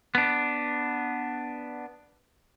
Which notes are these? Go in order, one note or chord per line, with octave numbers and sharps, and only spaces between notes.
B3 D4